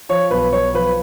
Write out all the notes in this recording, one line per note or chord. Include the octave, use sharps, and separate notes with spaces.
F3 C#5
B1 B4
B1 C#5
F3 B4